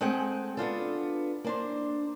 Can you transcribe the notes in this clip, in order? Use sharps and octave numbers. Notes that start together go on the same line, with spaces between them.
G#3 A3 C4 G#4 F#5 G5
B3 D4 F4 A4
A#3 D4 C5